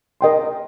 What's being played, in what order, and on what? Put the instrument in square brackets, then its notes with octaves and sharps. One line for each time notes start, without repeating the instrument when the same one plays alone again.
[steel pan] A#4 D#5 G5 C6